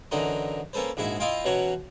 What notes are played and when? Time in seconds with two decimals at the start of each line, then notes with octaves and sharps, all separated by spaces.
0.11 F#2 D3 E3 D#4 C6
0.73 A#3 C#4 A4 B4 C5
0.97 A#1 G#2 G#3 E4 F#4
1.20 E4 F4 D#5 F5 G5 C6
1.45 B2 E3 F#3 C#4 F#5 C#6